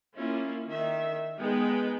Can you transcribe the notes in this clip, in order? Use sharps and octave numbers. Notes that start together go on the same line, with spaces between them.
A#3 C#4 E4 F4
D#3 E5
G#3 B3 D#4 G#4 B4 G5